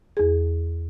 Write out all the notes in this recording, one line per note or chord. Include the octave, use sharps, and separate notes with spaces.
E2 G#4